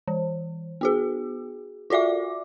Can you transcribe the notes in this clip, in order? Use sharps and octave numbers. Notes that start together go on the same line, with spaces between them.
E3
B3 F#4 G#4
F4 F#4 D5 E5 D6